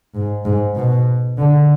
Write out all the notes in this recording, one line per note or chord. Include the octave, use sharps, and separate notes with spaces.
G#2
G#2
B2
D3